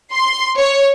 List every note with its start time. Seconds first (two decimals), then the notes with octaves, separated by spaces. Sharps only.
0.13 C6
0.59 C#5